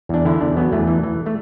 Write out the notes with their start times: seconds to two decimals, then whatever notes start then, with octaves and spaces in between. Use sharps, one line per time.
0.09 E2 D4
0.25 D3 E4
0.40 E2 D4
0.56 F#3 B3
0.72 E2 A3
0.87 E3
1.03 E3
1.26 A3